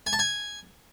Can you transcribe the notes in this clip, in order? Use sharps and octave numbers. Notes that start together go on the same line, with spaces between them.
G#5
A5
G#5